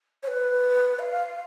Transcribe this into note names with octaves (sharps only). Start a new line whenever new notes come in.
C#5
B4
F5